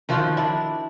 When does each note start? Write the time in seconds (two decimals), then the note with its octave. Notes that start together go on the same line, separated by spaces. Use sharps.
0.09 D#3 F3 F4 F#4
0.37 D4 E4